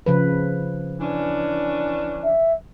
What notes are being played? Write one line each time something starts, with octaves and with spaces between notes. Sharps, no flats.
C#3 F3 B4
E3 C#4 D4
E5